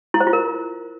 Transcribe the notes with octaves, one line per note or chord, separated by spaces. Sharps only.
E4
C5
F4
A#4